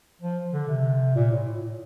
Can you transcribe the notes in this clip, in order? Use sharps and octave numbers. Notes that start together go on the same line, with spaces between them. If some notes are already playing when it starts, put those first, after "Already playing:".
F3
D3
C3
A#2
A2
A2